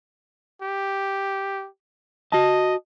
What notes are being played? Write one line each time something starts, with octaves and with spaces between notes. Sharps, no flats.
G4
F#4 D#5 A5